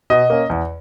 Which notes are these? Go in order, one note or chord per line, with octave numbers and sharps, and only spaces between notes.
B2 D#5
A#3 C#4
E2